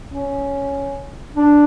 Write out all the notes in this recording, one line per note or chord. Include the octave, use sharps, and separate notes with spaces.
C#4
D4